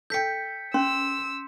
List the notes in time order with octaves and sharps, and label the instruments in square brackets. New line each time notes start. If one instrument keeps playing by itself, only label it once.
[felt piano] A4 G5 [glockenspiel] G6 B6 C#7
[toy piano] C#4 [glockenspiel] C6 [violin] E6